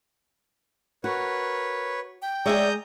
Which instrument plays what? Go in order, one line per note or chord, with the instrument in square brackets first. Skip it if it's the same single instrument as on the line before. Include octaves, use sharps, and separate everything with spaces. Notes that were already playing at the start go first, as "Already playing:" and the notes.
[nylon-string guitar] F#4 [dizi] A#4 [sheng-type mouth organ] B4 C#5
[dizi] G5
[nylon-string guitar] G#3 G#4 [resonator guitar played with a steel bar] C#5 D5 E5 [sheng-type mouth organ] A#5 D#6 G6